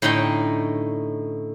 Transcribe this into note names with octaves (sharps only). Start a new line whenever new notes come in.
A2 D3 C#4 D#4 G5 C6